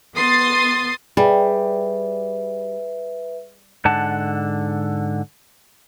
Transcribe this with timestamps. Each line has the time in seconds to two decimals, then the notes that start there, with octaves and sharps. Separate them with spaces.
0.16 B3 C6 D#6 A6 C7
1.17 G3 G#4 B4 E5
3.85 G#2 D3 F#5 A5